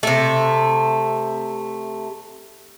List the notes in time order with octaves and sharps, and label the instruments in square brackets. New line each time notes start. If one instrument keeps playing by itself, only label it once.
[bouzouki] C3 A3